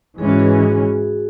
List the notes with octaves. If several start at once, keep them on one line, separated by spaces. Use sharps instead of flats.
G#2 E3 G#3 C#4 G#4
F#4
G#4